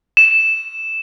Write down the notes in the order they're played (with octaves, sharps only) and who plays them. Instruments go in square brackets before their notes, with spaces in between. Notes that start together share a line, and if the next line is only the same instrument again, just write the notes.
[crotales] E7